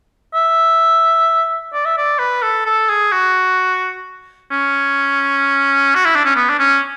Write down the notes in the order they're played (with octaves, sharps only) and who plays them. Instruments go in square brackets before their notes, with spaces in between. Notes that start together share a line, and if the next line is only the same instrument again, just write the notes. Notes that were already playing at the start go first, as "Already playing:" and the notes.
[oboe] E5
D5
E5
D5
B4
A4
A4
G#4
F#4
C#4
F#4
E4
D4
C#4
B3
D4
C#4